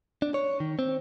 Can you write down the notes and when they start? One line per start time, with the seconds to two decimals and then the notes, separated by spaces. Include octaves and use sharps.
0.22 D4
0.34 C#5
0.60 D#3
0.79 C4